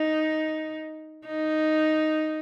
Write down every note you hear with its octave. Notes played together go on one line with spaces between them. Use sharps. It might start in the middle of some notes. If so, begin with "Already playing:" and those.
Already playing: D#4
D#4